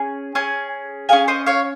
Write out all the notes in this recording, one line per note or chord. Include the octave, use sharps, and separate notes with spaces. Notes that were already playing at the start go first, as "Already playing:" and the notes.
Already playing: C#4 G#4 G#5
C#4 G#4
C#4 G#4 F5 G#5
C5 D#5
C#5 F5